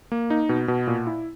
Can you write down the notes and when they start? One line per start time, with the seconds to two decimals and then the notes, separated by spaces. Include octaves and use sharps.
0.12 A#3
0.30 D#4
0.49 B2
0.68 B2
0.87 A#2
1.07 E4